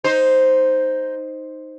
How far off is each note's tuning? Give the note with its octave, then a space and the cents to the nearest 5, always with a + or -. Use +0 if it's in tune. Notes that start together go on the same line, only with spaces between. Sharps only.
D#4 +0 C5 +0